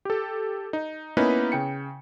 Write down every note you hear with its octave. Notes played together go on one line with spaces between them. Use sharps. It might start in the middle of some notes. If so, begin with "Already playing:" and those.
G4 A4
D#4
A#3 B3 C#4 D#4 E4 B4
C#3 G5 C#7